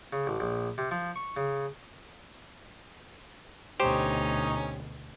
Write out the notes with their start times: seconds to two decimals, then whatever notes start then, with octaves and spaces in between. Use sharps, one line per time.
0.13 C#3
0.27 A1
0.40 A#1
0.78 C3
0.91 F3
1.16 C#6
1.37 C#3
3.80 D2 B2 C#4 D#4 G4 C5 C#5